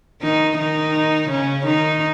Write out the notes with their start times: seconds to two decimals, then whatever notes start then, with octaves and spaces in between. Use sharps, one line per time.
0.22 D#3 D#4
0.58 D#3 D#4
1.30 C#3 C#4
1.66 D#3 D#4